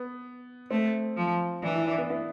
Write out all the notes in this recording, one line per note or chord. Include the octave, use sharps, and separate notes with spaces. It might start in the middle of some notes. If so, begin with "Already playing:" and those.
Already playing: B3
A3 C4
F3
E3 D4
E4
D4
B3
B3